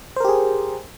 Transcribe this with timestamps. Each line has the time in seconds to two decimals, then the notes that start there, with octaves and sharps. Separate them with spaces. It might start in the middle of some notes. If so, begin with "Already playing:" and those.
0.16 C5
0.20 A#4
0.25 G4
0.29 G#4